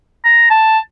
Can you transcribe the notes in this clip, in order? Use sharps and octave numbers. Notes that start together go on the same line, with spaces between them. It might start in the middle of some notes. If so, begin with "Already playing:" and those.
A#5
A5